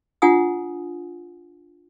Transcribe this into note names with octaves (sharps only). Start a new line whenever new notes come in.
D4 F4 F#5 G#5 D#6